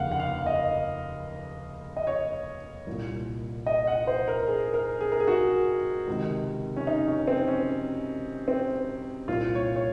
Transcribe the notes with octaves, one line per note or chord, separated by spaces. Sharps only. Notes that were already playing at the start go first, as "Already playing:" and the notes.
Already playing: F1 D#2 C#3 F5 F#5
F#5
F5
D#5
D#5
C#5
C2 A#2
D#5
F#5
C5
A#4
G#4
A#4
G#4
A#4
G#4
F#4
C#2 C3 D#3
C#4
D#4
C#4
C4
C#4
C4
C2 A#2 F4
C#5
C#5